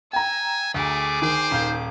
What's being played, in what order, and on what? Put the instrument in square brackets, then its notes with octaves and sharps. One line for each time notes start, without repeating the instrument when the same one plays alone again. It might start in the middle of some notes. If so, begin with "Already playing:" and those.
[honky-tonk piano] G5 A#5 [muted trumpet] G#5 [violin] E6
[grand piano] D2 [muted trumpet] A3 [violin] G#4 D6
[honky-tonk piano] D#3 [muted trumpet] C5
[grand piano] D#1 F5 G6